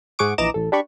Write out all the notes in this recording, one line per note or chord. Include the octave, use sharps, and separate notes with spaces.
G#2 G#4 F#5 C#6 D6 D7
A#1 E3 D#5 A#5 D6 E7
A1 A4
D4 G4 B5 C#6